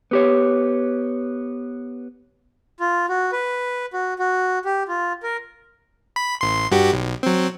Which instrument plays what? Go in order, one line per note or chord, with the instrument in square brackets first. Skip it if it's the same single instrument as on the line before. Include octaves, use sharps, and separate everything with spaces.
[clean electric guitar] B3 G4 C#5
[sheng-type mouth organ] F4
F#4
B4
F#4
F#4
G4
F4
A#4
[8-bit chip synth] B5
A1 C6
G2 F#4 G4
B1
F#3 C4